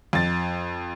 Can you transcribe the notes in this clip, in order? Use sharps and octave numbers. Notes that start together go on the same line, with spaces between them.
F2 A6